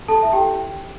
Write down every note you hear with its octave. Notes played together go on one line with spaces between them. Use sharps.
G4 A4 A5
E4 E5
G4 G5